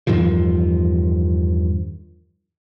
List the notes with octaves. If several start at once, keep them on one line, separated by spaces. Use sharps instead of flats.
E2 G2 D#3 F3